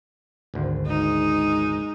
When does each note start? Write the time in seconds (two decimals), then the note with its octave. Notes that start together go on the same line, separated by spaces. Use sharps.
0.54 G#1 D2
0.87 G#3 D#4